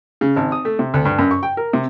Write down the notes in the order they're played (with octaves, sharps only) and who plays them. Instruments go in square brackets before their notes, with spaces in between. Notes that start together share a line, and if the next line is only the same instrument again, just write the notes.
[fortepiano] C#3
G#1
D#6
A3
C3
D2
G2
F#2
C#6
G5
A#4
C3